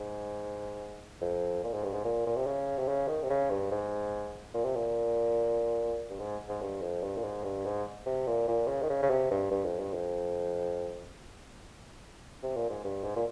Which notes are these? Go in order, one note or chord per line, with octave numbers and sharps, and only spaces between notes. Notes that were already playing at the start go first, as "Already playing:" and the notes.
Already playing: G#2
F2
A#2
G#2
G2
G#2
A#2
A#2
C3
C#3
C3
C#3
D#3
C3
C#3
G2
G#2
A#2
C3
A#2
G2
G#2
G#2
G2
F2
G2
A#2
G#2
G2
G#2
C3
A#2
A#2
C#3
D#3
C#3
C#3
C3
G2
G2
F2
G2
F2
C3
A#2
G#2
G2
G#2
A#2